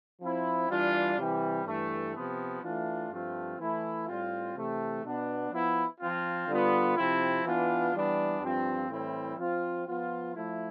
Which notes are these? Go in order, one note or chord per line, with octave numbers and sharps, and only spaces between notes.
F3 C4 E4
E3 G3 D4 F4
C3 E3 G3
G2 E3 A3
C3 F3 B3
E3 A3 D4 F4
G2 F3 A3 C4 F4
E3 A3 E4
A2 G3 C4 F4
C3 E3 A3
B2 B3 D4
F3 B3 E4
F3 C4 F4
D3 G3 B3 F4
C3 F3 C4 E4
E3 B3 D4 F4
E3 G3 B3 D4
G2 F3 C4 F4
A2 E3 G3 C4 E4
F3 C4 F4
F3 B3 F4
F3 A3 E4